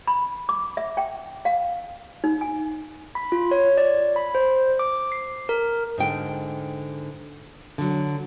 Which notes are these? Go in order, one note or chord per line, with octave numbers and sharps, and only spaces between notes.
B5
D6
E5
G5
F5
D#4
G#5
B5
F4
C#5
D5
B5
C5
D6
C7
A#4
G#2 D3 G5
D3 F#3